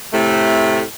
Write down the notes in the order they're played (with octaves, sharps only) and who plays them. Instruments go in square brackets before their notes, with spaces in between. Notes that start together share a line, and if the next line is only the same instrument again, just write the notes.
[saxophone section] A2 C3 A3